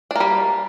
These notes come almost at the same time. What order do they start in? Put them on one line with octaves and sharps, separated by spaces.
D4 A#3 G3